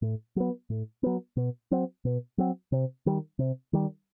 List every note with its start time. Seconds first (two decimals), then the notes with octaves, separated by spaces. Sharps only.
0.02 A2
0.36 F#3 B3
0.70 A2
1.03 F#3 B3
1.37 B2
1.71 F#3 C4
2.05 B2
2.38 F#3 C4
2.72 C3
3.06 D#3 G3
3.39 C3
3.73 D#3 G3